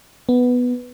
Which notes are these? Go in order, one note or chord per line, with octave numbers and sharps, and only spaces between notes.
B3